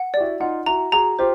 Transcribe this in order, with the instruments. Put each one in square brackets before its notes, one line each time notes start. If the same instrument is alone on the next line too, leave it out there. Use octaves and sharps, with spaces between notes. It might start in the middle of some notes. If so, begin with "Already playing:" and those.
Already playing: [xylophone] F#5
[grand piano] G4 [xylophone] D5
[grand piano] E4 F#4
[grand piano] D#4 F4 [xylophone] F#5
[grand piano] E4 F#4 [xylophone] A#5
[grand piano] F#4 G#4 [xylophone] A#5
[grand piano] F4 G4 [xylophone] C5